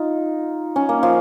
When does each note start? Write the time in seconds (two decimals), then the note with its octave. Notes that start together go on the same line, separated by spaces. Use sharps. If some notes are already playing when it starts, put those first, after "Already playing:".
Already playing: D#4 F4
0.76 C#4
0.89 A#3
1.03 F3